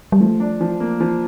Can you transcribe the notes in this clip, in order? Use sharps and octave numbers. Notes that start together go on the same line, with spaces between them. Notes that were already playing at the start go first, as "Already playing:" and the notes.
G3
F3 A3
D4
F3
A#3
F3